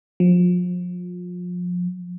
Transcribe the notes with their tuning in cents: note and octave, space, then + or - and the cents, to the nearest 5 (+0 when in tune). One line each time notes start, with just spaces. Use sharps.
F3 +30